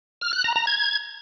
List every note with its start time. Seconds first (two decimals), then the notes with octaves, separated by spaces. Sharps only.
0.21 F6
0.33 F#6
0.44 A#5
0.56 A#5
0.67 G#6